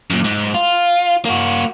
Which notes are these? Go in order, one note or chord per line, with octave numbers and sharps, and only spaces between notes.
F#2 A#2
G#2
F4
A#3 F#4